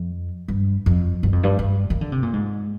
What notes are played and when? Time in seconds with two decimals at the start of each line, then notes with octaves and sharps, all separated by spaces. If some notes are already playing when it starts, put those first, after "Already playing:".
Already playing: F2
0.48 G2
0.86 F2
1.23 G2
1.32 F2
1.43 G2
1.59 G2
1.90 D#3
2.01 D3
2.12 C3
2.23 A#2
2.33 G#2